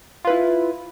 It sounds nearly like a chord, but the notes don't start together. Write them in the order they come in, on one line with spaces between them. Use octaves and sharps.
F4 B4 E4